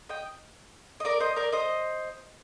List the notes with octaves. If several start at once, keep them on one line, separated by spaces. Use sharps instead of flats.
D#5 G5
D#5
A#4 D5
C5 D#5
A#4 D5
C5 D#5